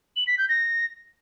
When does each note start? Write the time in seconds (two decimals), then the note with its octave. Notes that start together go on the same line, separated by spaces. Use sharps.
0.16 F#7
0.27 B6
0.38 G6
0.49 A#6